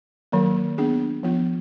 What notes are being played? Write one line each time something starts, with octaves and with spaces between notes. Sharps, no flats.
D#3 F#3 A#3
B3 D4 G#4
F3 B3 F4